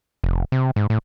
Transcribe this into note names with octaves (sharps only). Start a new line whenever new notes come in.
F1
C3
G#2
A2